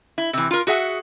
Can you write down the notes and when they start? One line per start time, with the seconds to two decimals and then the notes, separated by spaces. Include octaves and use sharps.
0.18 E4
0.33 C3 E3
0.51 F4 A#4
0.67 F#4 G#4 E5 F#5